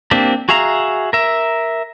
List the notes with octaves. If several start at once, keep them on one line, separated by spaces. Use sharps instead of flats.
A#3 C4 D4 G4
F#4 G#4 E5 F5 A#5
A#4 E5